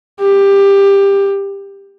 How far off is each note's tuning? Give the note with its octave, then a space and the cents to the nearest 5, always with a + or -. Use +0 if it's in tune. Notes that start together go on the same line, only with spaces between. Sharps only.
G4 +15